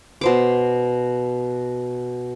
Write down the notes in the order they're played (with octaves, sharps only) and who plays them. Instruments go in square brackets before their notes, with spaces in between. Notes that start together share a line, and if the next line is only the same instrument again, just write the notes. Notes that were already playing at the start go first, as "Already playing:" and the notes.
[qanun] B2 C5 D6